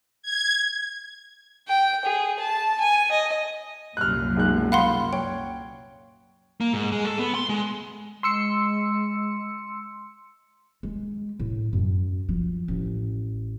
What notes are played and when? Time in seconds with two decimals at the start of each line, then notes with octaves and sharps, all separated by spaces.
0.22 G#6
1.68 G5
2.06 G#4
2.40 A5
2.80 G#5
3.11 D#5
3.97 C2 F#2 A#2 F6 F#6
4.36 B1 G#3 F#6
4.72 F5 F#5 B5 C6
5.13 C#5 G5
6.61 A#3
6.73 G#2
6.92 G#3
7.05 A4
7.19 B3
7.35 C6
7.49 G#3
8.23 G#3 C6 E6 C#7
10.83 G#3
11.39 A2
11.73 F#2
12.29 F3
12.68 A1